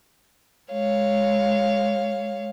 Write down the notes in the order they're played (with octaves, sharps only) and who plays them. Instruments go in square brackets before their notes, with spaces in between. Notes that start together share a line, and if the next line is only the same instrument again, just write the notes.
[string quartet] G#3 C#5 F5